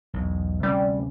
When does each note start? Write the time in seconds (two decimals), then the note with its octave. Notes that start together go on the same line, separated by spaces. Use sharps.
0.14 B1 E2
0.63 D2 C3 G3 C#4